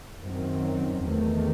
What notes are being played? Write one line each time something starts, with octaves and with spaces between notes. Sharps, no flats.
F#2 D#3 F#3 C4
E2 D#3 A3